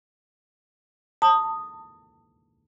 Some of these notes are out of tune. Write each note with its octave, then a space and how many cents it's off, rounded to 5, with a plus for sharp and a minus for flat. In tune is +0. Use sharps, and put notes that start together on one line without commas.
A5 +30 D#6 -5